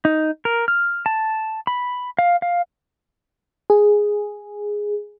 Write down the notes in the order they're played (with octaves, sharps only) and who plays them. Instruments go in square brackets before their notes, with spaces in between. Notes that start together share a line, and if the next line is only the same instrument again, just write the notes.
[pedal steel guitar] D#4
A#4
F6
A5
B5
F5
F5
[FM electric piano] G#4